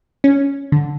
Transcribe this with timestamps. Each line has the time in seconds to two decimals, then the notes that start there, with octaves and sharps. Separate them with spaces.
0.24 C#4
0.72 D3